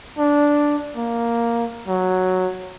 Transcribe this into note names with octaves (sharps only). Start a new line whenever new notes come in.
D4
A#3
F#3